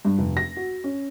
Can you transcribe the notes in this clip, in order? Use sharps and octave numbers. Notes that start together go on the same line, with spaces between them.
G2
F1
A#6
F#4
C#4